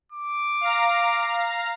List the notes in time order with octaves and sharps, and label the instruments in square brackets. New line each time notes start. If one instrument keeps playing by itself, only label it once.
[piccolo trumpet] D6
[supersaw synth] F5 A#5